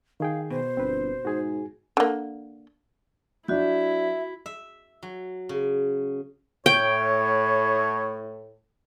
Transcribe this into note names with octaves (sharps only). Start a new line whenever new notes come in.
D#3 G#4 F5 G5
B2 C5
G1 C4 B4
G#2 F#4 G#4 G#5
D3 A#3
F#3 D4 E4 F#4 E5 G6
E5
F#3
C#3
A2 C#5 G5